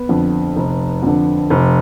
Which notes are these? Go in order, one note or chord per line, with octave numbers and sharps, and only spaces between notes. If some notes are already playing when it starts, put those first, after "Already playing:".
Already playing: B3
F2 D3
F1
F2 D3
F1